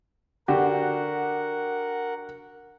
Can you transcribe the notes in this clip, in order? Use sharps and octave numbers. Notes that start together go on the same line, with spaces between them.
D3 F#4 G4 A#4 F#5